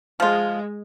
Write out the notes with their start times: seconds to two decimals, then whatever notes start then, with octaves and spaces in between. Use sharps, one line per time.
0.20 F3 G#3 F4